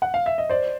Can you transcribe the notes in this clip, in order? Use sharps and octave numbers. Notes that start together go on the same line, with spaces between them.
F#5
F5
E5
D#5
C5 D5